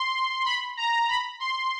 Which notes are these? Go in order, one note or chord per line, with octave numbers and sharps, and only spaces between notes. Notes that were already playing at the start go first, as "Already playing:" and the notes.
Already playing: C6
B5
A#5
B5
C6